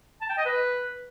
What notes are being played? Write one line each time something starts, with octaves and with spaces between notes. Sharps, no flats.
A5
G5
D#5
B4